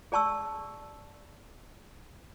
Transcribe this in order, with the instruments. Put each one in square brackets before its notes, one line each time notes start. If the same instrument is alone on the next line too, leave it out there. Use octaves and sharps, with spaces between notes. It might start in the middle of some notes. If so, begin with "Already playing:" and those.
[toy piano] G#4 D5 A5 C#6 E6